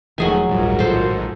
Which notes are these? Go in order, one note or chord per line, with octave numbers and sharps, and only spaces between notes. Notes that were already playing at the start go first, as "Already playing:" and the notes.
E1 D#3 F3 F#3 A3 G#4 G#5
D#1 A#1 D#2 G#2 G3 F4 F#4 A#4
A2 D#3 A4 C5